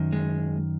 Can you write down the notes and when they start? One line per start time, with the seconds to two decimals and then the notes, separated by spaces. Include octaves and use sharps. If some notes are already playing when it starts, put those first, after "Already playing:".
Already playing: F#2 D#3
0.12 G#3